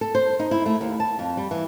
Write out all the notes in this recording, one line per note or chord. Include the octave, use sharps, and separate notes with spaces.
A4
C5
D#4
E4
A3
D#2
A5
F2
G3
E3